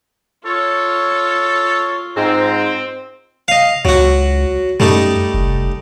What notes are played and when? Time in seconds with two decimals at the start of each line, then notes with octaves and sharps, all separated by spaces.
0.45 F4 A4 C#5
2.16 G#2 C4 A#5
3.48 D#5 F5
3.85 C#2 F#3 F#4
4.80 F#2 G3 A3 D#4
5.34 F1